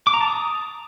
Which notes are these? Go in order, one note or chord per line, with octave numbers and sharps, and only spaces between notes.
D6
A#5
A5
D#6